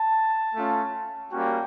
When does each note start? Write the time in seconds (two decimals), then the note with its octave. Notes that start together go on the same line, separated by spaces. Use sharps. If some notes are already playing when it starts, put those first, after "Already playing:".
Already playing: A5
0.55 A3 C#4 F4
1.31 G3 A#3 C#4 F#4 G5